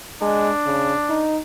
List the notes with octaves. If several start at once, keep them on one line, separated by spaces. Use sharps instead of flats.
G#3 D4
C#3
D#4